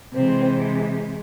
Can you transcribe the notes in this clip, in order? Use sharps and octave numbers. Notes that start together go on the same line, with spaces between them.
C3 E3 G#3 C4